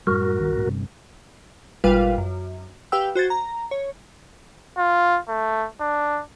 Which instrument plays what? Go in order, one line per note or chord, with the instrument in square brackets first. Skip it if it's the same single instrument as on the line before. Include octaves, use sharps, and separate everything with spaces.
[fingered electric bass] F#2 A2 G3 [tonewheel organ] F#4 A#4
[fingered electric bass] G1 C2 D#3
B1 G#2
G1 G2 C3
[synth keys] G#1 A#2 G3 F4 B4 F5
F#2
G4 B4 F5 G5 E6
F#4 C5 G#6 A6
A#5
C#5
[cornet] F4
A3
D4